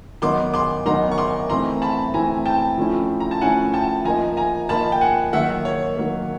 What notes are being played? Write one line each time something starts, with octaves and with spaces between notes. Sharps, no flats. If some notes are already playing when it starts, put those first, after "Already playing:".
D#3 F#3 B3 D#4 C6 D6
C6 D6
D#3 F#3 B3 D#4 A#5 C6
C#6
C6 D6
E3 A3 C4 E4 A#5 C6
A5 B5
E3 A3 C4 E4 G#5 A#5
G5 A5
F3 A3 C#4 E4
A#5
A5
F3 A3 C#4 E4 F#5 G#5
G5 A5
F3 A#3 D#4 G#5 A#5
G#5 A#5
F3 A#3 D#4 A5 B5
G5
F#5 G#5
D#3 F#3 A#3 E5 F#5
C#5
D#3 F#3 A#3